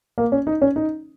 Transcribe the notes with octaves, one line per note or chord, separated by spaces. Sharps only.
A#3
C#4
D#4
C#4
D#4